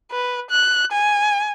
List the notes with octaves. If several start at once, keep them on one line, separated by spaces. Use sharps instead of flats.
B4
F#6
G#5